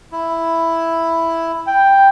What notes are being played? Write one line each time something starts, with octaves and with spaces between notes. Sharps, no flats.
E4
G5